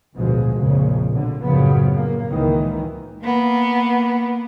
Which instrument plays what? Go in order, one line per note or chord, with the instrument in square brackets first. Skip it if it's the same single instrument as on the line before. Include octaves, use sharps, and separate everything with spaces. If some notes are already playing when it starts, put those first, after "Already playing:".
[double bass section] A1 D2 B2 F3 G#3
A#1 F2 A#2 C#3
B2 D3
A1 F#2 C#3 F3 B3
A2 A#3
C#2 A#2 D#3 E3
[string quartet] A#3 B3